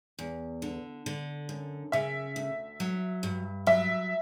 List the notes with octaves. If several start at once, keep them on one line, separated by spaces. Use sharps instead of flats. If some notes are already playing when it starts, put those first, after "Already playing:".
E2
D3
D3
F#2
C#3 E5
D2
F#3
G2
F#3 E5